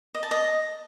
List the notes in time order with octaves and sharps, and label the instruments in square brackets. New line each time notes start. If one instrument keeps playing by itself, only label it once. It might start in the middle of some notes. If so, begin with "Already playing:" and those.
[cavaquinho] D#5
A5
D#5